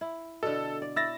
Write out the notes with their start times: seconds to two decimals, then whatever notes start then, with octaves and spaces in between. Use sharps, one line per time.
0.01 E4
0.43 B2 D3 A4
0.82 D5
0.96 E4 E6 A6 A#6